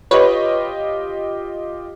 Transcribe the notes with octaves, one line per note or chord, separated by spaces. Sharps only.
F4 G4 B4 C#5 D#5